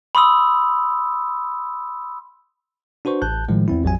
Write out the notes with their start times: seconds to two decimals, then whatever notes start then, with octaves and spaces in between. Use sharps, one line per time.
0.15 B5 C6 D#6 E6
3.05 D4 F#4 B4 C5 C#6
3.22 A1 A5 F#6 G6
3.49 A2 D#3 F3 G#3
3.68 E2 C4 E4
3.83 A1 F2 F#3 G#5